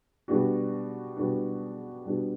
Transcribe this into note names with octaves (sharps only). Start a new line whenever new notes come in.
B2 G3 B3 D4 F#4
B2 G3 B3 D4 F#4
B2 G3 B3 D4 F#4